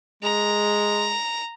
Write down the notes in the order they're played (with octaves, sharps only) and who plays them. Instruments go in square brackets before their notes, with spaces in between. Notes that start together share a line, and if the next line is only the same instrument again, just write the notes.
[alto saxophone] G#3 [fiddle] A#5